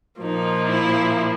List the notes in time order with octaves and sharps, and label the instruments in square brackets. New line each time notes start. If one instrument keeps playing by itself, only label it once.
[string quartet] A#2 F3 A#3 D#4
E4